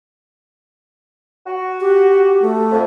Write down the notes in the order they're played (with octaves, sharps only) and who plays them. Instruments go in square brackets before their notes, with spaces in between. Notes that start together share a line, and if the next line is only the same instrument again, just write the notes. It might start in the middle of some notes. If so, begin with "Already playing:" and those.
[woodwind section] F#4
[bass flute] G4
A3
[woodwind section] F2